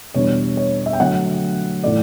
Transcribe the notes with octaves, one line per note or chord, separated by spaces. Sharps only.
E2 B2 G3 D4 C#5
C#5
E5
G5
D3 F#3 A3 F#5
A2 E3 A3 E4 D5